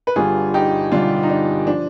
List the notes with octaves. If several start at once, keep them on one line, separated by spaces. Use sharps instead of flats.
B4
G1 G2 D3 G3 F4 G#4
D#4 G4
G1 G2 D3 G3 D4 F4
D#4
D4
F3 D4